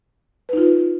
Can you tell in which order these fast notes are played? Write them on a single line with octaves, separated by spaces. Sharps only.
B4 D#4 F4